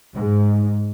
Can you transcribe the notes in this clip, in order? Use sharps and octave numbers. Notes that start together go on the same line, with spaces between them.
G#2